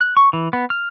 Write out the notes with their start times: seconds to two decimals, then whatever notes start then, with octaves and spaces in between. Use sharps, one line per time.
0.01 F#6
0.17 C#6
0.33 E3
0.53 B3
0.70 F6